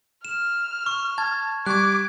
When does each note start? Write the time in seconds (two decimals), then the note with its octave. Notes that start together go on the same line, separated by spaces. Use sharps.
0.25 F6 E7
0.86 C#6
1.18 A5 G#6
1.66 G3 C#6 D6 F#6 G#6